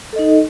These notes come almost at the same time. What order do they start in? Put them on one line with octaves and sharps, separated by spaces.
A4 D#5 D#4